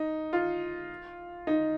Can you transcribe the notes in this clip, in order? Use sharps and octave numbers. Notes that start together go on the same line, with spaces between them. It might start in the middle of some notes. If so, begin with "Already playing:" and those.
Already playing: D#4
F4
D#4